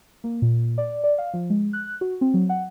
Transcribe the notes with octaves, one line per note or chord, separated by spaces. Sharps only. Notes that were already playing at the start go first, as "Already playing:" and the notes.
A#3
A#2
D5
D5
F5
F3
G#3
F#6
F#4
C4
F#3
F#5